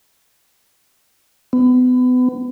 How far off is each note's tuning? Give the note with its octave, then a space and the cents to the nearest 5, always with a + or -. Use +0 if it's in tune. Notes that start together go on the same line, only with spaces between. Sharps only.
B3 +30